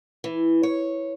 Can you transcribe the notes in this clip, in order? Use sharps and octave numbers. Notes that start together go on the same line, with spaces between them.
E3
C#5